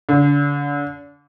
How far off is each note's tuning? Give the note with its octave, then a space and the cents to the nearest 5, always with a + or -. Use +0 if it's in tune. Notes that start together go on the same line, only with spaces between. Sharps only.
D3 -35